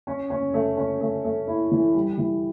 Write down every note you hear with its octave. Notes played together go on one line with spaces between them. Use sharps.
C#4
C#4
A3
C#4
A3
A3
E4
E3
G3
E3